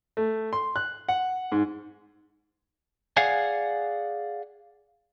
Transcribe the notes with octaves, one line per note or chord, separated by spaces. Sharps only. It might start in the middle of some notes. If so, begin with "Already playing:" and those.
A3
C6
F#6
F#5
G#2
G#4 D5 F5 F#5 G#5